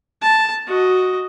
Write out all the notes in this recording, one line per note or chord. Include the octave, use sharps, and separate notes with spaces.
A5
F#4 D#5